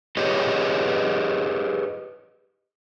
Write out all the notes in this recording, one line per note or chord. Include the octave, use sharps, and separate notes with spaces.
G4 G#4 B4 C#5 D#5